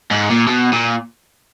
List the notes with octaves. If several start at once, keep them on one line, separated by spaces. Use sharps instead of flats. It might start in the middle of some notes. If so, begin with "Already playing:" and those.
G#2
A#2
B2
A#2